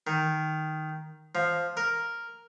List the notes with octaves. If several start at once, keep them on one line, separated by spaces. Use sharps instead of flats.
D#3
F3
A#4